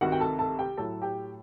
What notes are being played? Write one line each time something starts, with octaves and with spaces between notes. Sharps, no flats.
C2 C3 D#3 F#4 F#5
G5
A4 A5
A4 A5
G4 G5
A2 F#3 A3 A4 A5
G4 G5